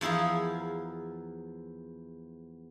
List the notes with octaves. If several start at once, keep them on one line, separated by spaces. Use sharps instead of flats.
E2 F3 E4 G#4 A#4